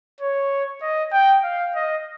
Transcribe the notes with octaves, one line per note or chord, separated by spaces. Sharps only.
C#5
D#5
G5
F5
D#5